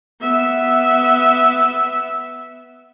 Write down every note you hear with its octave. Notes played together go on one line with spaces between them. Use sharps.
B3 E5